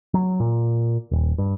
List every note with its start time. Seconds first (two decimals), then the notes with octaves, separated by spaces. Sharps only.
0.14 F#3
0.40 A#2
1.11 D#1
1.38 G2